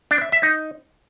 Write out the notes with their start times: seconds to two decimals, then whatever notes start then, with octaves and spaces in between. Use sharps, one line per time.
0.11 D4
0.22 E5
0.32 E5
0.43 D#4